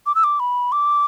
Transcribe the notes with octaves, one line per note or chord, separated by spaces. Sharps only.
D6
E6
D6
B5
D6